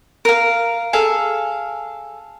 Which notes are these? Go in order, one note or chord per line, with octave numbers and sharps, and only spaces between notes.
A#4 F5
G#4 A4 F5